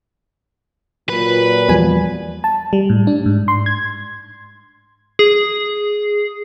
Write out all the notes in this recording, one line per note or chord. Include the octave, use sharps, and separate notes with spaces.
A#2 F#3 B4
E2 F3 G3 B3 G#5
A5
G3
A2
D4
G#2
C6
G#6
G#4